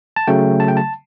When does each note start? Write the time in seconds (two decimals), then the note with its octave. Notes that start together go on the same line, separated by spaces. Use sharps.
0.16 A5
0.27 C#3 F#3 A3 G5
0.60 A5
0.68 G5
0.77 A5